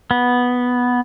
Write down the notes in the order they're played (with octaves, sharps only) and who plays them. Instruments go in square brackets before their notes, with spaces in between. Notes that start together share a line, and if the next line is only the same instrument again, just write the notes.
[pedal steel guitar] B3